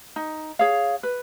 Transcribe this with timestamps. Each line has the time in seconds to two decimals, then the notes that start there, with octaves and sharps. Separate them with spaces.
0.16 D#4
0.59 G#4 C#5 F5
1.03 B4